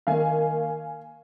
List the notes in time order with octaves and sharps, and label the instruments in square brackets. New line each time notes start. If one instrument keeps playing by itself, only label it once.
[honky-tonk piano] D#3 A#3 F5 G#5